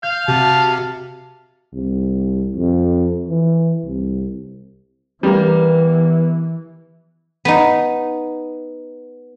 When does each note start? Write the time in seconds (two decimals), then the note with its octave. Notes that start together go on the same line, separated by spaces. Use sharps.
0.03 F5 G6
0.28 C3 F#4 A5
1.74 C2
2.56 F2
3.29 E3
3.85 C2
5.23 E3 G3 A#3 B3
7.45 B3 D#4